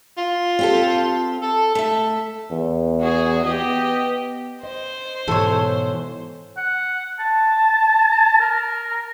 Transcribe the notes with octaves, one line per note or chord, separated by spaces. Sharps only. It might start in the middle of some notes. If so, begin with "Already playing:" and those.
F4
C4 G4 A4
A4
A3 A4 E5
E2
F#4 G#4
B3 G4 D#5
C5 D#5
G#2 B2 E3 A4 C#5
F#5
A5
A#4